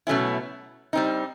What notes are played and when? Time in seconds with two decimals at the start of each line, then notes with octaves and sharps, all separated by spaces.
0.07 B2 F#3 A3 C#4 E4
0.93 G3 C4 D#4